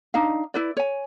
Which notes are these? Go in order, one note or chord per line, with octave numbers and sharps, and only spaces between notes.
D4 D#4 D#5 F5
E4 B4 D5
C#5 G#5